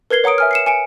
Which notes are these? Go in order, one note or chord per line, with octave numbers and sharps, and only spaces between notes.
A#4 B4 G#6 C7 G7
C#5 F#5 A#5 D#6 D7
E5 G#5 F6
C7 C#7 E7
G#5 C#7 D7